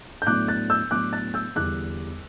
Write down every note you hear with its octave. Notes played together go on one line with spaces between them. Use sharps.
G6
A2 F#3 B3 D4 D6 F#6
F#6 A6
E6 G6
A2 F#3 B3 D4 D6 F#6
F#6 A6
E6 G6
E2 D3 G3 D6 F#6